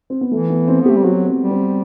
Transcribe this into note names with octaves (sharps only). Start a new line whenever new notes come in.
C4
B3
E3 A3
B3
C4
B3
A3 G4
G3
F#3 F#4
C4
G3
C4